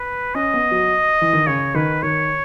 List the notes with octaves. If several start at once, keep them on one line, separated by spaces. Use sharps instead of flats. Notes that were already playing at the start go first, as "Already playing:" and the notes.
Already playing: B4
C#4 D#5
B3
F#3
E3
D#3
C#3 C#5
D#3 B4
D#3 C#5